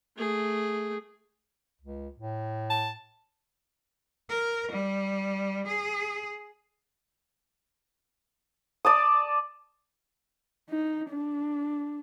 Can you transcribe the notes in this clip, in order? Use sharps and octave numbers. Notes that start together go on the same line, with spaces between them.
A3 G#4
C#2
A2
A5
A#4
G3
G#4
D5 A5 D#6
D#4
D4